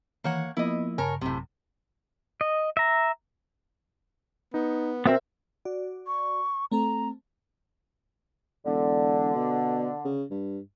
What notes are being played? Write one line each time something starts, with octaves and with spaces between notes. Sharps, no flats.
D#3 E3 A#3 C#5 F#5
F3 A#3 B3 E4 D#5
G2 C#3 A#4 C#5 G#5 A5
A1 F#2 A2 C3
D#5
E5 A#5
B3 D#4
B2 B3 C4 A#4 C5 E5
F#4 D5
C#6
A3 C4 A4 A#5
E1 D3
B2
C#3
G2